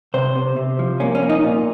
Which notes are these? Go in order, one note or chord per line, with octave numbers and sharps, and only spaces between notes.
C3 C5
C3
C3
F3
A#3 C#4
C#4
A#3
D#4
A#2